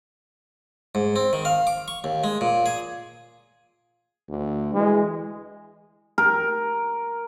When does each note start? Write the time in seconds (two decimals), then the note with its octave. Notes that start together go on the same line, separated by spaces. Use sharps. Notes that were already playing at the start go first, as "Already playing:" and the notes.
0.95 G#2
1.16 C4
1.33 D#3
1.45 F5
1.67 D6
1.88 C#6
2.04 D#2
2.24 G#3
2.41 A#2
2.66 G#4
4.29 D2
4.75 E3 G#3
6.18 A#4